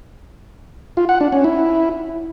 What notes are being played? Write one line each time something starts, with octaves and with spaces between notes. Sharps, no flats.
F4
F#5
D4
C#4
E4